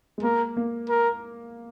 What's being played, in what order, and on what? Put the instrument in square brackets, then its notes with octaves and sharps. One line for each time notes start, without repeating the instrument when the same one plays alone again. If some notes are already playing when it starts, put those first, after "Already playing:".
[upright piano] G#3
[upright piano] A#3 [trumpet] A#4
[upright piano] A#3
[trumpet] A#4